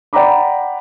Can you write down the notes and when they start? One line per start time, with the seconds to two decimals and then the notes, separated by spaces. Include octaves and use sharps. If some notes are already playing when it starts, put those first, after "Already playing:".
0.13 D5 F#5 G5 A#5 B5 D6